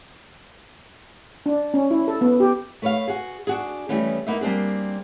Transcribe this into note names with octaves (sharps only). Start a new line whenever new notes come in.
D4
C#4
E4
A4
B3
G4
A3 B4 C#5 D#5 F5
F#4 G#4
D4 F#4 G#4
E3 F3 G3 A3 B3 C#4
A#3 B3 D#4 E4 E5
G3 A#3 C4 D4 G#4